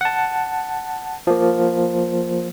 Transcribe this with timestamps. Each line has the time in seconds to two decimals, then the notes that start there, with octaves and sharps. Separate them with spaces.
0.01 F#5 A5
1.27 F3 A#3